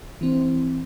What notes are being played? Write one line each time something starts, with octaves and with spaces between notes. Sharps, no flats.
E3 C4